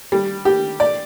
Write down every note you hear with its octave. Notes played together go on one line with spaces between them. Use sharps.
G3
G4
D5